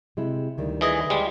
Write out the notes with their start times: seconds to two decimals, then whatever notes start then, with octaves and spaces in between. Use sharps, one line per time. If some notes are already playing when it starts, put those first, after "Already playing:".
0.17 C3 G#3 E4
0.58 D2 D#3 G3
0.81 E3 G#4 D#5
1.10 G3 G#3